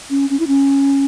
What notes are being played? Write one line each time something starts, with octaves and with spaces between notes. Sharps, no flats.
C#4
C#4
E4
C#4